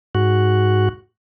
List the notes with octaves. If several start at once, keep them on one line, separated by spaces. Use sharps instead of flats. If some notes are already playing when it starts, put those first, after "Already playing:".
G#2 F#4